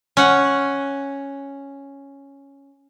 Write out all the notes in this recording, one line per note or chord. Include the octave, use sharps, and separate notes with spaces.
C#4 F#5